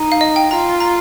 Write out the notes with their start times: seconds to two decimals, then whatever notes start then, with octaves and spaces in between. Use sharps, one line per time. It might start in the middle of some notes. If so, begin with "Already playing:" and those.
Already playing: D#4
0.12 F5
0.21 D#5
0.36 G5
0.50 F4 A#5
0.80 A#5